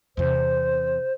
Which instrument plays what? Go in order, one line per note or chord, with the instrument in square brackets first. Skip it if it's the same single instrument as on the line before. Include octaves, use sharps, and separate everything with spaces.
[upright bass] E2 C3 [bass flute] C5